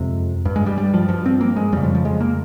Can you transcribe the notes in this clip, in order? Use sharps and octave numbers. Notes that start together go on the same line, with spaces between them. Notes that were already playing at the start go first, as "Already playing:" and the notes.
Already playing: F2 C3 G#3
G2
G#3
G3
G3
F3
G2 F3
C4
A#3
G#3
F2 C#3 G3
F3
F3
G#3
A#3